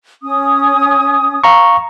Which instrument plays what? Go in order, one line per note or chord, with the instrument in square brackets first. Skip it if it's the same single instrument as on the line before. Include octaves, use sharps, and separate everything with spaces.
[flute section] C#4 D#6
[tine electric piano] F5 A#5 C#6